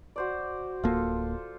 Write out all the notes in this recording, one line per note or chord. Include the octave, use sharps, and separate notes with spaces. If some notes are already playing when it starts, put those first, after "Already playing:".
F#4 C5 D5
D1 A#3 F4 A4